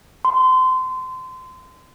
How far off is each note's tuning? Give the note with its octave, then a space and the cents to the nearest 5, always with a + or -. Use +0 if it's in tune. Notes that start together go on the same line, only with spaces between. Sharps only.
C6 -25